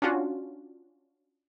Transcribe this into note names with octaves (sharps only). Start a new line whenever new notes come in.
C#4 D4 F4 F#4